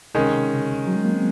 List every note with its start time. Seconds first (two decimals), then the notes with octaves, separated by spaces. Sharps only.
0.14 C3 D#3 G#3 C#4
0.51 C#3
0.87 F#3
0.96 G#3
1.04 A#3
1.14 C4